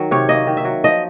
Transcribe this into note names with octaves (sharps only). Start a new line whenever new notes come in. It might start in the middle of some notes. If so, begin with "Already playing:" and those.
Already playing: D#3 F#3
C3 C#5
A#3 D#5
D#3
E5
F#3
F3 D#5